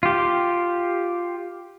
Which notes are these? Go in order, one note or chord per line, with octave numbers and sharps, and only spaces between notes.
F4 G4